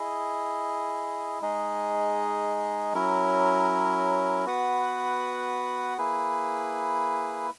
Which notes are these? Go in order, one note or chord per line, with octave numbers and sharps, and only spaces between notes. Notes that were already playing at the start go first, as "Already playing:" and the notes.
Already playing: E4 G#4 D#5
G#3 D#4 G#4 D#5
F#3 C#4 E4 A#4
B3 F#4 B4 F#5
A#3 E4 G#4 B4